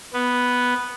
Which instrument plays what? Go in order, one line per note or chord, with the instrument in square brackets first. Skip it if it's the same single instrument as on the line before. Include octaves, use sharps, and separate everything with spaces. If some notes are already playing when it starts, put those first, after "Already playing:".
[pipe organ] B3